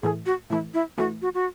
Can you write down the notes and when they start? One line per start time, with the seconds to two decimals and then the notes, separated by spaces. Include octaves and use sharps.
0.03 A2 E3 A3 G#4
0.26 F#4
0.50 A2 E3 A3 E4
0.74 E4
0.98 A2 E3 A3 F#4
1.22 F#4
1.34 F#4